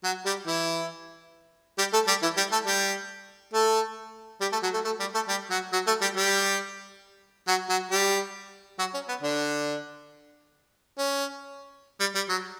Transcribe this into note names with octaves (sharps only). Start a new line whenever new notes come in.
F#3 F#4
G3 G4
E3 E4
G3 G4
A3 A4
G3 G4
E3 E4
G3 G4
A3 A4
G3 G4
A3 A4
G3 G4
A3 A4
F#3 F#4
A3 A4
A3 A4
G3 G4
A3 A4
G3 G4
F#3 F#4
F#3 F#4
A3 A4
G3 G4
G3 G4
F#3 F#4
F#3 F#4
G3 G4
F#3 F#4
C#4
B3
D3 D4
C#4
G3
G3
F#3